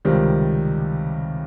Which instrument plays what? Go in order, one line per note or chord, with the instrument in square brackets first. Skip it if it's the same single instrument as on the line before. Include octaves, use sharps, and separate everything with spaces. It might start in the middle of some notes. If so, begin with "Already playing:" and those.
[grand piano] C#2 C3 D#3 G3